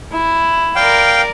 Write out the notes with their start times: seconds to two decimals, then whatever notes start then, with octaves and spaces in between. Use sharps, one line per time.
0.13 E4
0.76 A#4 D5 F5 G5